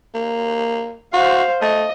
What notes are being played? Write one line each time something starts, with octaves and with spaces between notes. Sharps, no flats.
A#3
F#4 C5 F5
A3 D#5